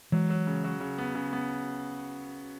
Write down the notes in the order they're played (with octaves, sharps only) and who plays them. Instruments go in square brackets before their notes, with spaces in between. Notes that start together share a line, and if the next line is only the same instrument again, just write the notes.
[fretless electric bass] E3 G#3 [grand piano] F#3
[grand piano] F#3
C#3
F#3
C#3
B3
C#3
B3